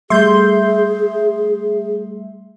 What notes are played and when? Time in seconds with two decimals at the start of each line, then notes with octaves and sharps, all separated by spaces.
0.10 G3 A3 G#4 E5 C6 G6